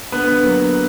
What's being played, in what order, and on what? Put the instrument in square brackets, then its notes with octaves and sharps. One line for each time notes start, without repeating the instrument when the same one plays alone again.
[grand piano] D3 B3 B4
F#3 A#3